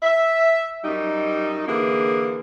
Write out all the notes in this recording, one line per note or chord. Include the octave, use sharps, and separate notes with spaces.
E5
F#2 G3 D#4
D3 E3 A#3 G#4